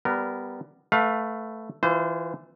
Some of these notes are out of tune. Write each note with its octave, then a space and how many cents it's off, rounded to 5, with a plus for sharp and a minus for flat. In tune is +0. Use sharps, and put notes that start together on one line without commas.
G3 +0 B3 +10 A#4 -10
A3 +0 B4 +0 F5 +25
E3 +0 F4 +5 C5 -30